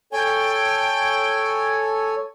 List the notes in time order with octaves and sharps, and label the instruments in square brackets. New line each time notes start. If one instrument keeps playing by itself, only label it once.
[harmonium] A4 C#5 G#5 [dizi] G5